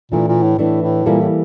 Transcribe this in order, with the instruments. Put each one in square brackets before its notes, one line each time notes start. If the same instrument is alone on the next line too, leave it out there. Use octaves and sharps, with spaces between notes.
[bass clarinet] A#2 [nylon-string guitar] E3 A3 D4
[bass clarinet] A#2
A2
[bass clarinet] A2 [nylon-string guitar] E3 A3 D4
[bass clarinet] A2
[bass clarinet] A#2 [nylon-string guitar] E3 G3 A#3 E4 A4
[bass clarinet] A2